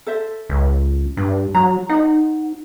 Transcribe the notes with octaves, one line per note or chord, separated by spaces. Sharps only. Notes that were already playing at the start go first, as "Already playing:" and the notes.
A4 C5 E5
C#2
G2 D4
F#3 A#5
D#4 C5 F#5